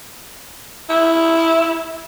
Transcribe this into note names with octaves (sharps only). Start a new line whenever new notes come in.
E4